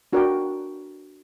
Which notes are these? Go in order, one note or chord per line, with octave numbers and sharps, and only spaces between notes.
D4 F#4 A#4 D5 G5